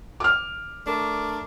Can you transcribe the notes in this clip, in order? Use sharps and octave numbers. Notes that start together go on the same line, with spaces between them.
D6 F6
A3 D4 A#4